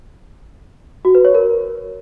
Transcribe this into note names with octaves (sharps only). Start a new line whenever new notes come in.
F#4
B4
C#5
A#4